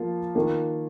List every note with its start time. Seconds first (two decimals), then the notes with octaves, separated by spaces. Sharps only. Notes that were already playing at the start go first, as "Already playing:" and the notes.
Already playing: F3 A#3 F4
0.35 D#3 A#3 F4